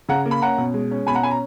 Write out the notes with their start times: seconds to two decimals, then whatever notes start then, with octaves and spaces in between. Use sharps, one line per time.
0.09 C#3 F#5 A#5
0.26 A#3
0.31 B5
0.42 C#4 F#5 A#5
0.58 B2
0.74 G#3
0.91 C#4
1.07 B2 G#5 B5
1.15 F#5 A#5
1.23 C#4 G#5 B5
1.31 A#5